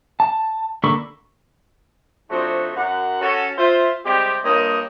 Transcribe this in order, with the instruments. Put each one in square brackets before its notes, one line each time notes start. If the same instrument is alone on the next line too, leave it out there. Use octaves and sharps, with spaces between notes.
[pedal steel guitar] A5
D3 A#3 A4 B5 C#6
[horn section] C3 F3 A3 D4 D#4 F#4
F#2 F#5
C#4 F#4 A4
F4 C5 E5
C3 G3 G#3 G4
G2 A#3 F4 C#5 D#5